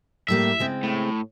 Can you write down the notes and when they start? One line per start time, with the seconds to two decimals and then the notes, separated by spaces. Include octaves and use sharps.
0.28 A2 G3 A#3 E5
0.59 C#3 G#3 C4
0.83 A2